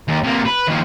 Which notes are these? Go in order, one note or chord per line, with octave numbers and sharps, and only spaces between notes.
D#2
C3 A#3
B4
D#2 F3